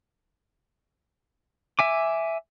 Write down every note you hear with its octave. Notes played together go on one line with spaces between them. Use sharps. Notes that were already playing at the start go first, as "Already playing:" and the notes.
E5 G#5 D6